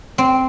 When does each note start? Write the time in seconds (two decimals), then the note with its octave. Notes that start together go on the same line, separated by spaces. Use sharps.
0.18 C4